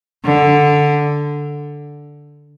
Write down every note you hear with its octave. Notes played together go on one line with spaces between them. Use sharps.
D3